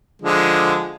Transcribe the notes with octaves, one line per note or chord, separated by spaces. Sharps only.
D3 F3 G#3